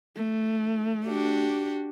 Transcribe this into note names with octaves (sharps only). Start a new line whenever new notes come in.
A3
D4 F#4 G4